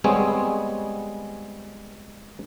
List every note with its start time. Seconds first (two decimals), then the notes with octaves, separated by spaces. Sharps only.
0.04 G3 G#3 B3 C4 G#4 C#5